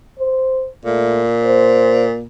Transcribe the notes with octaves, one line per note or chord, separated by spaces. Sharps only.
C5
A#2 A3
C5